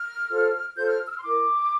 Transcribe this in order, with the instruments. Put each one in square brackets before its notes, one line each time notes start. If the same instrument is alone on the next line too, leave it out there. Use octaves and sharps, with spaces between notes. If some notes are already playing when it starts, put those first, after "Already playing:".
Already playing: [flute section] F6
F4 A4 C5
F4 A4 C5 G6
F6
E6
F6
C6
E4 A#4 D6